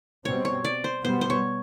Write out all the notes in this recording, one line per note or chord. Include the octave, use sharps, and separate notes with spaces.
B2 G3 C4 C#5
C#5
D5
C5
B2 G3 B3 C5
C5
C#5